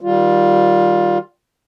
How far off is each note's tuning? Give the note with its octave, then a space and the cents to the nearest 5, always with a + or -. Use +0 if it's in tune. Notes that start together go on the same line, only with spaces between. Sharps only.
D#3 +0 G3 -5 F4 +15